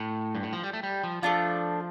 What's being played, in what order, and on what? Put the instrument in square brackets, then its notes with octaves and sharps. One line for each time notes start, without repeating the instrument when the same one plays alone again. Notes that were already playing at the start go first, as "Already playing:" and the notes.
Already playing: [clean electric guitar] A2
G2
A2
F3
G3
A3
G3
F3
[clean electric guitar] F3 [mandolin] A3 D4 F4